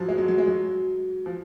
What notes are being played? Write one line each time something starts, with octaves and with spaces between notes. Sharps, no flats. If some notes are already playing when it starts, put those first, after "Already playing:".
Already playing: G#2 F3 F#3
G#3
F#3
F#3
G#3
F#3
F3